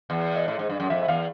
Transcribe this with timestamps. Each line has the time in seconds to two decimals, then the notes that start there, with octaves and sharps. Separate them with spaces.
0.10 E2
0.36 D#5
0.48 A2
0.59 G#2
0.69 G2
0.80 F#2
0.90 F2 E5
1.02 E5
1.08 E2 F5